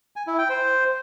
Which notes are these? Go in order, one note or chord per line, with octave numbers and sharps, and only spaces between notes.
G#5
E4
G5
C5